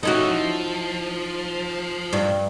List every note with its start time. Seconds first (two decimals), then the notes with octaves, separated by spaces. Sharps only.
0.03 C#4 D#4 E4 F#4 A4
0.30 F3
2.13 G2